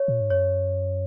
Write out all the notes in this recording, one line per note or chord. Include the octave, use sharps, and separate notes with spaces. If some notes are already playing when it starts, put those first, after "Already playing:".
Already playing: C#5
A#2
G#2
F#2 C#5